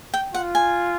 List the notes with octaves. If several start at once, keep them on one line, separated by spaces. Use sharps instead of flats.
G5
F4 F#5
G#5